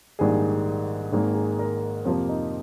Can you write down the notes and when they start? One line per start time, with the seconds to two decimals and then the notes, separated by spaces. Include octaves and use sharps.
0.19 A#1 G#2 D#3 G3 G#4
1.12 G#1 G#2 D#3 A#3 G#4
1.35 G#4
1.59 A#4
2.05 F2 C3 F3 A#3 F4
2.29 D#4